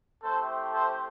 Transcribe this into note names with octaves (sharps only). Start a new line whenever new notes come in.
A3 C4 E4 G4 A4 C5
A4 C5